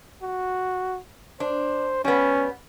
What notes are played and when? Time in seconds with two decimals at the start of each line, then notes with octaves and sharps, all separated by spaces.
0.22 F#4
1.40 D4 C5
2.05 G3 B3 C#4